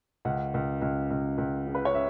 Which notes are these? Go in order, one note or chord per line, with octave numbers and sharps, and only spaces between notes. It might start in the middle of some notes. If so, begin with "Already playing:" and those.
C#2 F#5
C#2
C#2
C#2
C#2
C#3
B4
C#5
C#3 E5